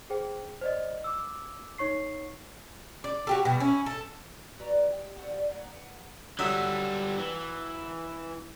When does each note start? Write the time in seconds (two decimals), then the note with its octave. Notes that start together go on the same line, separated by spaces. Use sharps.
0.10 G#4 C5 G5
0.61 C5 D5 D#5
1.04 D6 E6
1.78 D#4 C#5 C#6 C7
3.04 D5
3.27 F#4 G4 A4
3.45 B2 G3
3.60 C#4 E4
3.86 A4
4.59 F#4 B4 D5 A#5
4.89 G#3 G4
5.16 C4 D4 F#4
5.30 F3 G3 A3 D4
5.51 A#2 F#3 A#3
5.70 B3
6.39 D3 F#3 G3 E5 D#6
7.18 E3